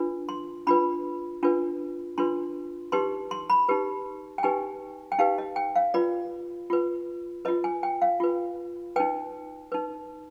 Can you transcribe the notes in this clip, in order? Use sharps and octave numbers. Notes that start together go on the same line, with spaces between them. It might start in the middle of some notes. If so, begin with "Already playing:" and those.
Already playing: D4 F4 B4
C6
D4 F4 B4 B5
D4 F4 B4
D4 F4 B4 C6
D#4 G4 B4 C6
C6
B5
D#4 G4 B4
G5
D#4 G4 B4 G#5
G5
D#4 G4 B4 F5
D#5
G5
F5
F4 B4 D5
F4 B4
F4 B4 D#5
G#5
G5
F5
F4 B4
D#4 B4 G5
D#4 B4